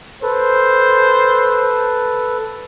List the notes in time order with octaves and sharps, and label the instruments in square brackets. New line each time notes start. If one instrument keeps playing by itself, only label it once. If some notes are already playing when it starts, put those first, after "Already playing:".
[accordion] A4 B4 [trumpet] C5